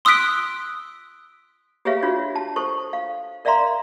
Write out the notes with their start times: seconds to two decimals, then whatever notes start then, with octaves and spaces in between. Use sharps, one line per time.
0.05 C6 D#6 E6 F#6 B6 D7
1.85 G4 G#4 B4 C#5 E5 F5
2.02 D4 F4 F#4 C#5
2.36 A5
2.56 A4 C5 C#6
2.93 F5
3.45 A#4 D5 E5 F5 A#5 C6